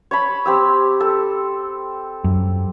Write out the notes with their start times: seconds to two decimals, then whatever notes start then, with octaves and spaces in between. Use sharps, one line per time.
0.11 C#5 A5 B5
0.45 C4 G4 E6
1.00 A4
2.24 F#2